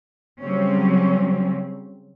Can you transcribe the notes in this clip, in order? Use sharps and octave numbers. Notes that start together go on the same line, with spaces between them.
C#3 F#3 G3 C4 C#4